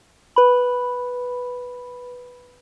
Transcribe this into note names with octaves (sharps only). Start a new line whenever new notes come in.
B4 B5